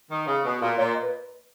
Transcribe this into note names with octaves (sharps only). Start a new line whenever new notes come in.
D#3
C#3
B2
A#2
A#2 C#5
D#5
B4